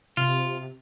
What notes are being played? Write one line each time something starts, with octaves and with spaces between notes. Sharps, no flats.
C3 F4